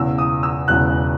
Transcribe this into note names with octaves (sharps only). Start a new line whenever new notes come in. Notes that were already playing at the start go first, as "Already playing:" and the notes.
Already playing: E1 E2 C#3 E6
D#6
E6
E1 E2 C#3 F#6